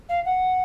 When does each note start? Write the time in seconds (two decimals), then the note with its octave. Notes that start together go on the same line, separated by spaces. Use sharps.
0.09 F5
0.25 F#5